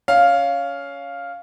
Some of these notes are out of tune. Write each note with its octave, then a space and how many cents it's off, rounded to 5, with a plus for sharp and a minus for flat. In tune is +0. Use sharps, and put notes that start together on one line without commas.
C#4 +15 F5 +0